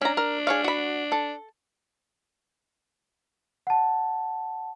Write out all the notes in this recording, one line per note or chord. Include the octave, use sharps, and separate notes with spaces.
C#4 D4 A#5
A#4
G#4 C#5 F5
F#4 B5
A4
F#5 A5